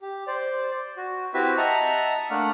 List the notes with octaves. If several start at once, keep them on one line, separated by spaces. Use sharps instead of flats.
G4
C5 D5
F#4
C4 E4 F#4 G4 B4 E5
D#5 E5 F#5 A5 A#5
A3 A#3 D4 D5 F#5 F6